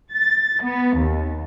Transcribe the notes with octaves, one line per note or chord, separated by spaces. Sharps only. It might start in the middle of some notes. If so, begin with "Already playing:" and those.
A6
B3
D#2